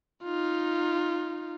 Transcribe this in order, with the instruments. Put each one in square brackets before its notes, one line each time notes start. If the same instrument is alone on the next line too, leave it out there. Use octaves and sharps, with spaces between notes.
[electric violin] D#4 F4